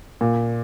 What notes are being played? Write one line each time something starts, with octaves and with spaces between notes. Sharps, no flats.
A#2